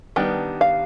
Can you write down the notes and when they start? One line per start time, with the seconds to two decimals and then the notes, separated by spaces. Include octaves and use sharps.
0.16 D#3 G3 B3 D4 G5
0.61 F5